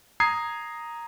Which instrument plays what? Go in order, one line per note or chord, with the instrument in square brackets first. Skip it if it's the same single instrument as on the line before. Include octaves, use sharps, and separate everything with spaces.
[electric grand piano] A#5 D#6 G#6 C7